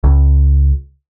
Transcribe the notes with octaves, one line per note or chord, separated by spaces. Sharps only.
C#2